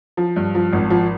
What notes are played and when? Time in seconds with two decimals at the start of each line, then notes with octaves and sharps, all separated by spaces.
0.17 F3
0.36 G2
0.55 F3
0.73 G#1
0.90 F3